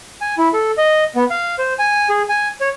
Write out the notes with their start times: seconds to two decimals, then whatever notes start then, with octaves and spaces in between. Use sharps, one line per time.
0.21 G#5
0.38 E4
0.53 A4
0.78 D#5
1.15 B3
1.30 F5
1.58 C5
1.79 G#5
2.10 G#4
2.29 G#5
2.61 C#5